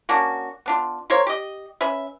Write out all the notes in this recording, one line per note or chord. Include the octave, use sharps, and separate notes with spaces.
A#3 C#4 D4 F#4
B3 D4 F4
A#3 A#4 C5 C#5
G4 D#5
C#4 B4 E5